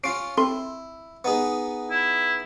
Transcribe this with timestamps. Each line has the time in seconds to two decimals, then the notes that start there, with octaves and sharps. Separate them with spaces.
0.04 C#4 F4 C7 D7
0.37 C4 E4 A4 C6
1.24 B3 D#4 G#4
1.91 E4